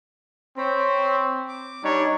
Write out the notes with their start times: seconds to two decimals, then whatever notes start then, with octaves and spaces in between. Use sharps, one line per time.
0.58 C4 C5 C#5 B5
1.48 D6
1.84 G3 D4 D#4 C#5